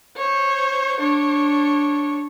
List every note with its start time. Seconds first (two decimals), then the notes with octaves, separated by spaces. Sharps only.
0.16 C5 C#5
1.00 D4 C#5